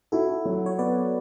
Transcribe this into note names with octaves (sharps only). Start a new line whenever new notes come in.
E4 F#4 A4
F#3
C#5
B3 B4 D5